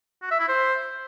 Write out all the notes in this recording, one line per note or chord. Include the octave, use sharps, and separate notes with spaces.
F#4
E5
E4
C5